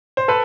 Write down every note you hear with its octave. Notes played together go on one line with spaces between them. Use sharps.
C5
A4 B4